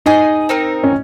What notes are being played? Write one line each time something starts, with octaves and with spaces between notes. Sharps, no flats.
D#4 G#4 D#5 G#5
C4 D#4 A#4
C#4